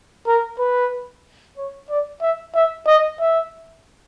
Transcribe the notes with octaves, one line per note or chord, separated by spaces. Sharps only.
A#4
B4
C#5
D5
E5
E5
D#5
E5